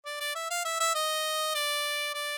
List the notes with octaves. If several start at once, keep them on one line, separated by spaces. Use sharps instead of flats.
D5
D5
E5
F5
E5
E5
D#5
D5
D5